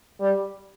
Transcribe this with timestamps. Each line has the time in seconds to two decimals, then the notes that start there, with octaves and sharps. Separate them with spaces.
0.20 G3